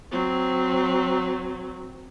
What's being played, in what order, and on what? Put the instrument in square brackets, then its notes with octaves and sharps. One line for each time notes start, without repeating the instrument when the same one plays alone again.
[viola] F#3 C4